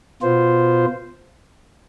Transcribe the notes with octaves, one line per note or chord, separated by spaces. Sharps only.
B2 B3 F4 C5